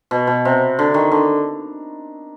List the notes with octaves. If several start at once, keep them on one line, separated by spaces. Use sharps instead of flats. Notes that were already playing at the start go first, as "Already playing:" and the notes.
B2
B2
C3
D3
D#3
D3